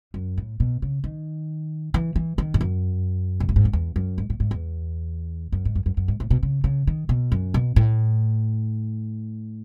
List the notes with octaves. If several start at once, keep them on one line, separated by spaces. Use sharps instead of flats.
F#2
A2
B2
C#3
D#3
E3
E3
D#3
G#2
F#2
B2
A2
G#2
F#2
E2
F#2
G#2
A2
G#2
E2
F#2
G#2
F#2
F#2
F#2
G#2
A2
B2
C#3
C#3
D#3
B2
F#2
B2
A2